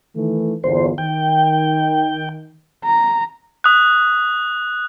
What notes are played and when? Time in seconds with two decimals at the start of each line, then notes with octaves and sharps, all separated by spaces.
0.15 D#3 E3 A3
0.64 G1 E2 A#2 C5
0.98 D#3 G5
2.85 A#5
3.64 D#6 F#6